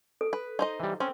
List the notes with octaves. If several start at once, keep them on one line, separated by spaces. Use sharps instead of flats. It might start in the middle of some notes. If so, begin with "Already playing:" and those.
A4
B4
D#4 C5 D#5
E3 G3
C4 C#4